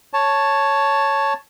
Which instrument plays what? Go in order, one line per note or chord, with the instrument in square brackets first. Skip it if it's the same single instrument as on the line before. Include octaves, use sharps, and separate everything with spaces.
[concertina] C#5 A5